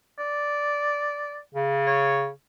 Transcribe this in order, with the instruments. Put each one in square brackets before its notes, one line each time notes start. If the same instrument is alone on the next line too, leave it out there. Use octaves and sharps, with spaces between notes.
[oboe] D5
[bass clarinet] C#3
[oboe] C#5